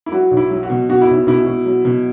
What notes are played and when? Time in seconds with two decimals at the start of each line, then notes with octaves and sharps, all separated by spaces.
0.06 E4
0.12 F#3 F#4
0.31 B1
0.37 E4
0.51 F#3
0.63 F#4
0.70 B2
0.89 B2 F#4
1.02 E4
1.09 B1
1.27 B2 E4
1.46 B2
1.66 F#3
1.85 B2